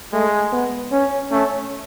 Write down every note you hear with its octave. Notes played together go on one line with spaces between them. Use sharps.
G#3 A3
B3
C#4
A3 C#4